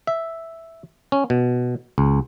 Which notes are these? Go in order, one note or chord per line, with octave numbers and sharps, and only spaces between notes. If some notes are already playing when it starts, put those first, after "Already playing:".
E5
C#4
B2
C#2